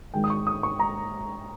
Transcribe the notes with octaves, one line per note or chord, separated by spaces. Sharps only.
G#1 G#2 D#3 G#3 G5
D#6
C#6
D#6
C#6
A#5